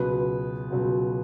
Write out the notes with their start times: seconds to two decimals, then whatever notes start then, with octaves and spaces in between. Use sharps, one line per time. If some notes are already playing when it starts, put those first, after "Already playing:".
Already playing: C#2 B2 F#3 B4
0.70 C#2 B2 F#3